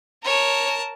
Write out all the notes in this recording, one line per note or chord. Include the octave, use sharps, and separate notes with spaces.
A#4 C#5 A5